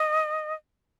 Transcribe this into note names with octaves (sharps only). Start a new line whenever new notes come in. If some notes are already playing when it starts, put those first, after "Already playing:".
Already playing: D#5